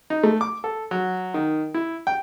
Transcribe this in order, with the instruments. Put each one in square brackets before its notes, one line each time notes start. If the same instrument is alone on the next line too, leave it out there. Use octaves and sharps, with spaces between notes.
[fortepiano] D#4
A3
D6
A4
F#3
D#3
E4
G5